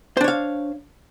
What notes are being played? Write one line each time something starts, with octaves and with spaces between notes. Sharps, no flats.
D4 C5 C#5 F5